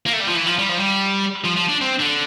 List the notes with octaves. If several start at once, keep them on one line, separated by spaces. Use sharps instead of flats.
A#3
A3
G3
F3
E3
F3
G3
F3
G3
F3
F3
D4
C4
D3